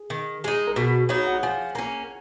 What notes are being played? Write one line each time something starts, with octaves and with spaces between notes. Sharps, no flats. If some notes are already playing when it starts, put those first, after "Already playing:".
Already playing: G#4
D#3
G#3 D#4
A#4
B2 G#4
F#3 B3 D#4 C#5
F#5
F3 G#5
A#3 C#4 A#5